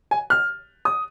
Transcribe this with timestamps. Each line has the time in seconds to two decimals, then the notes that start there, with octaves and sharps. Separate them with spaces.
0.11 G#5
0.30 F6
0.85 D#6